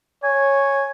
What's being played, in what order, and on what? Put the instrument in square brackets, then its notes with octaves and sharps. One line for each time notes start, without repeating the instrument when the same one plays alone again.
[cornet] C#5 [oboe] G#5